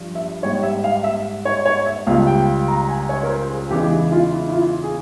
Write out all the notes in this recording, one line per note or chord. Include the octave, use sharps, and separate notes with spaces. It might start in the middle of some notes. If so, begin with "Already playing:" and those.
Already playing: G2 F3
E5
G#2 G3 C#5
E5
F5
E5
C#5
C#5
E5
C#2 C#3 G3 F5
G5
A#5
G#5
C#5
A#4
C5
G#4
E2 C#3 E3 G#3 G4
E4
F4
E4
E4
F4
G#4